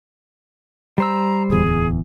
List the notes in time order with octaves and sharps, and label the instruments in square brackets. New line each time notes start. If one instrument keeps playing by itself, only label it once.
[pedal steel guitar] G3 C5 E6 [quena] A#5
[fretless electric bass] D1 E2 [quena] G#4